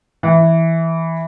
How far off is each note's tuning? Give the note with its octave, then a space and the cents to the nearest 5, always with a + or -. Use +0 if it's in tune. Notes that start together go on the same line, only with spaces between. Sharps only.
E3 -5